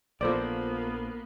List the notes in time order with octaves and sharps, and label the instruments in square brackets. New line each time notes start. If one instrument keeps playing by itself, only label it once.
[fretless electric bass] A#1 F3 [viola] A#3 B3 [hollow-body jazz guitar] A4 C5 D5